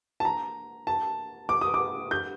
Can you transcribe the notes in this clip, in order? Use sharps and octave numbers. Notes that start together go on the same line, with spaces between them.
A5
A#5
A5
D6
D#6
D6
G6